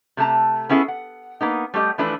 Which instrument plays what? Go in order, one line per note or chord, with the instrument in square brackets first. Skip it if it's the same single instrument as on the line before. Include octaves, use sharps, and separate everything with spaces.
[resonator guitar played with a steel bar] C3 A3 G#4 A5 A#5
B3 C#4 E4 G#4 A4
F#5
A#3 B3 D#4
G3 A3 G4 D#5
E3 F3 A3 D4 B4